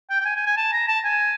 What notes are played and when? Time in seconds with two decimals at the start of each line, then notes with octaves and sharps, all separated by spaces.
0.10 G5
0.20 G5
0.25 G#5
0.36 G#5
0.46 G#5
0.57 A5
0.72 A#5
0.88 A5
1.04 G#5